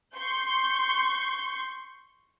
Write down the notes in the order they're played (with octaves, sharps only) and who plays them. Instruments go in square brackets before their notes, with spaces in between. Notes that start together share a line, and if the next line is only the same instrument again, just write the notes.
[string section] C6 C#6 G6